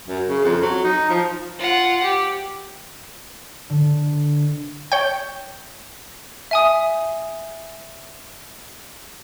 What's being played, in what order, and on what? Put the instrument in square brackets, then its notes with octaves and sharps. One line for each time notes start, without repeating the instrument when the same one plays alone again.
[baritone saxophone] F#2
C#3
F2
F#3
D#4
F3
[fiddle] F4 F#5
G4
[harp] D3
[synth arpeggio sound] C#5 G5
[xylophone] E5 G#5 D#6